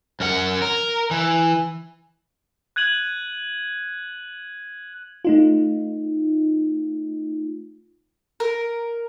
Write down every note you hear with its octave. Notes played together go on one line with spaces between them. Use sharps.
F#2 A#4 F#5
A#4
E3
F#6 G#6 D#7 F#7
A3 D#4 F4
A#4